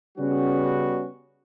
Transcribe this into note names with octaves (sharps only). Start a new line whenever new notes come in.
C#3 G3 B3 C#4 F#4